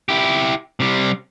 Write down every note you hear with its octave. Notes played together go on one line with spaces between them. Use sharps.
E4 G4
C3 G3